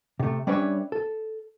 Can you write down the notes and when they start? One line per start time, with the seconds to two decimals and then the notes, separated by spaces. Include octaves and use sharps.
0.19 C3 A3
0.47 G3 C#4 D4 B4 C#5 E5
0.92 A4